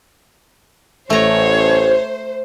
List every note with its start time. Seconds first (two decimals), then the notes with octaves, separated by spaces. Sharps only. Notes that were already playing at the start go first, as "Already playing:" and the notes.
1.10 A1 A3 C5 C#5 A#5